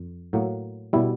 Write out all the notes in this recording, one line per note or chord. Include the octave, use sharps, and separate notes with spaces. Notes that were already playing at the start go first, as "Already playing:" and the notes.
Already playing: F2
A2 F#3 A#3
B2 G3 E4